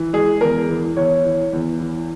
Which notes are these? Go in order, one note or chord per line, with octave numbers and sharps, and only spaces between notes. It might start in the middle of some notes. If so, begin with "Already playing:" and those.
Already playing: E3
G#3 G#4
E2 A#4
E3
E2 C#5
E3
E2
E3